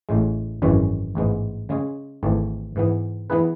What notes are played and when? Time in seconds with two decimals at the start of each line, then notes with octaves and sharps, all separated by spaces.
0.09 A1 A2 G#3
0.62 G#1 F#2 E3 G#3 C#4
1.15 A1 G#2 G#3 B3
1.69 C#3 G#3 C#4 G#4
2.23 G#1 G#2 E3 A3
2.76 G#2 E3 B3
3.30 E3 B3 E4 G#4 B4